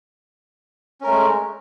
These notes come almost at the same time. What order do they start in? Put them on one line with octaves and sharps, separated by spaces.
C#4 A#4 A3 G#3